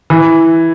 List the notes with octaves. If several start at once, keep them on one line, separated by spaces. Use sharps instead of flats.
E3